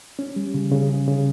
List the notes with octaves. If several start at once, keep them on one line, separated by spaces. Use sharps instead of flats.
C#4
G3
C#3
C#3
C#3
C#3